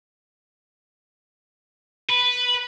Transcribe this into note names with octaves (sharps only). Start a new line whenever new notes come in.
B4